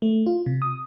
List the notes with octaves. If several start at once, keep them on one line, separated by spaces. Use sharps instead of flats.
A3
F4
C3
D#6